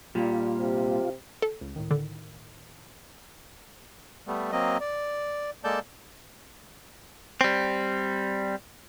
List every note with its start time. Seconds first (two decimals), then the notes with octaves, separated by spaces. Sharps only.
0.15 A#2 G3 F4
0.59 C3
1.42 A4
1.61 C#2
1.76 A2 D#3
1.91 D3
4.27 G3 A3 B3
4.52 F#3 A#3 C4 D#5
4.81 D5
5.64 G#3 A#3 A4 D5 A5 G6
7.41 G3 C4